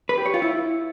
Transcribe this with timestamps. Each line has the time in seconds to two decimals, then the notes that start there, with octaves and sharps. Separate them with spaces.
0.09 B4
0.17 G4
0.26 C#5
0.34 F4
0.42 E4